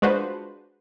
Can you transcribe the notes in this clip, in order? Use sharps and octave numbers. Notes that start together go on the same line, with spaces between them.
G#3 D4 F4 F#4 B4 C5